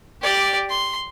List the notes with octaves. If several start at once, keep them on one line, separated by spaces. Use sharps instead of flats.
G4 D5
C6